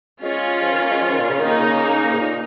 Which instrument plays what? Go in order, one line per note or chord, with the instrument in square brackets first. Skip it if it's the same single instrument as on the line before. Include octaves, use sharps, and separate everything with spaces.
[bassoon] G#3 [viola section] C#4 F4
[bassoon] F3
D#3
A#3
G#3
F3
D#3
A#2
C#3
[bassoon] D#3 [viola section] A#3 D#4
[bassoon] C#3
G#2
A#2